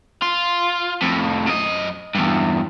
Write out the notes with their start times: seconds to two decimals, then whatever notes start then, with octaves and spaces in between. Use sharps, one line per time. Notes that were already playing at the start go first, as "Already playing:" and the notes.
0.22 F4
1.02 F2 A2
1.47 F#2 D#5
2.15 E2 G2